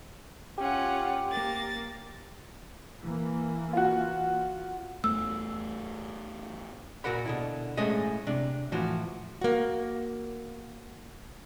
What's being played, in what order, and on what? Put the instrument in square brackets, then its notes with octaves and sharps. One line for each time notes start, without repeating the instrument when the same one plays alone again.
[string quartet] C#4 F4 F#5 [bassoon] G4
[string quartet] A#3 A6
[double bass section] E3 A#3
[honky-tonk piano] F4 F#4
[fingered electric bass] E2 A3 [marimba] E6
[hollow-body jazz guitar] A#2 F#4 A#4 F#5 B5
B2 D3 E4
A2 G#3 A3 C#4 D#5 E5
C3 D4
A2 E3 F3 F#4
[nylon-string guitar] A#3 F#4